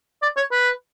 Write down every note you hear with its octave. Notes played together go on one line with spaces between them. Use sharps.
D5
C#5
B4